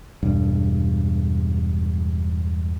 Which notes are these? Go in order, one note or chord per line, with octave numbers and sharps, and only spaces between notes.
E1 G2